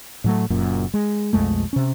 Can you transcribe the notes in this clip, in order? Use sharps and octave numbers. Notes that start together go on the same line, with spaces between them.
A2 F#3 A3
F#1 F#2 A#2
G#3
B1 F2 G#3 A3
C3 C#4